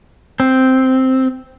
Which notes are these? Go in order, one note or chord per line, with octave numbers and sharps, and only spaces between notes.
C4